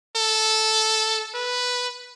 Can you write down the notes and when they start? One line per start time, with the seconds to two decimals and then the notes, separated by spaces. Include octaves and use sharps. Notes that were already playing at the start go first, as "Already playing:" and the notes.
0.16 A4
1.34 B4